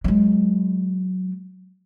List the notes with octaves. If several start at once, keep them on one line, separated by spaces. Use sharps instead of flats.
F#3 G#3